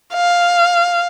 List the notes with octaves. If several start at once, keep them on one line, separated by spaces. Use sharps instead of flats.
F5